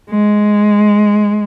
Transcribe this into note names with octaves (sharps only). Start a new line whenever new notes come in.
G#3